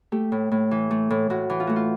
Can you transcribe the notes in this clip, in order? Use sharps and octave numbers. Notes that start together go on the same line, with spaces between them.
A3 G4
A2
A2
E3
A3
A2
A2 F#4
E3
F4
A3 F#4
F4